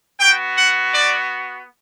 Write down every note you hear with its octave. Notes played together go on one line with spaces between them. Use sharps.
B3 F#4 G5
F#5
D5